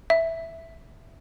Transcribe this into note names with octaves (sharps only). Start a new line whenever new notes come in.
E5